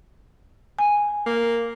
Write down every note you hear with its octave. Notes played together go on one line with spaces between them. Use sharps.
G#5
A#3